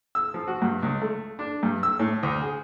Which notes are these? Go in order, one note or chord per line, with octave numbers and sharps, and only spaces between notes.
E6
F3
F#4
G2
C#2
A3
D4
G2
E6
A2
D2
G#4